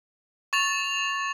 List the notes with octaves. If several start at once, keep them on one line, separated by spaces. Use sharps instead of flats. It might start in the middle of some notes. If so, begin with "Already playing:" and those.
C#6 A6 F7